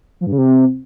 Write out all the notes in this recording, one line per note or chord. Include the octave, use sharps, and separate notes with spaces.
F3
G2
C#3
C3